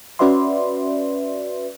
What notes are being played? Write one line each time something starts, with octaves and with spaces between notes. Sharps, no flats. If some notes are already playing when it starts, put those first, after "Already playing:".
C#4 F#4 B4 D5 E5 C6